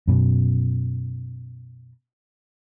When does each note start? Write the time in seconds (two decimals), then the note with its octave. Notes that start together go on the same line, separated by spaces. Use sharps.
0.08 F#2 B2